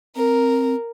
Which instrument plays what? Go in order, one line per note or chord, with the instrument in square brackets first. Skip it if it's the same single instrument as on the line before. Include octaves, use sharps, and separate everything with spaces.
[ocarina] C4 [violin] A#4